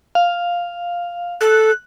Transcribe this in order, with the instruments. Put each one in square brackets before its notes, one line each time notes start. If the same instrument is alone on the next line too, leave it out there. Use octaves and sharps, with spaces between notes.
[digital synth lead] F5
[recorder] A4 [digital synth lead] F#6